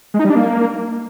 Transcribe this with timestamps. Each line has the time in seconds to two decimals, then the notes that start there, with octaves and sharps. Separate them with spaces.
0.14 G#3
0.19 D#4
0.25 G3
0.30 D4
0.35 A#3